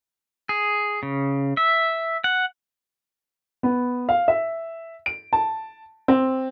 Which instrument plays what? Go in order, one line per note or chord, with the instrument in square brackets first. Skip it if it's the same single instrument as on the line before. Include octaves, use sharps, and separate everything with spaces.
[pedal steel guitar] G#4
C#3
E5
F#5
[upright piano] B3
F5
E5
D7
A5
C4